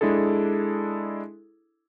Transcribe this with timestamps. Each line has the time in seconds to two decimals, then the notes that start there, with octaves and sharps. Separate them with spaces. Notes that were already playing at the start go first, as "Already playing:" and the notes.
0.01 G#3 D4 E4 G#4 A4